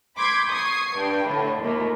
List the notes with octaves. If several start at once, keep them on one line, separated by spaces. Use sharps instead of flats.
B5 C6 D6 G6 G#6 B6
C#6 D#6 G#6 C7
G2 G5
A2 D3
D#2 A#2 A3 A#3